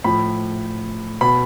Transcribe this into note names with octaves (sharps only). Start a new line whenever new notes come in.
A2 F3 B5
B2 B5